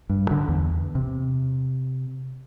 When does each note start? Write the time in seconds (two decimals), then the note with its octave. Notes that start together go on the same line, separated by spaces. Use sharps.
0.10 G2
0.31 D3
0.49 E2
0.95 C3